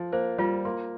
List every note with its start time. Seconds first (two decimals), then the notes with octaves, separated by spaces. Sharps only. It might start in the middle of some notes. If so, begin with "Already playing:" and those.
Already playing: F3
0.12 A#3 C5
0.38 G3 F4
0.65 A#3 C6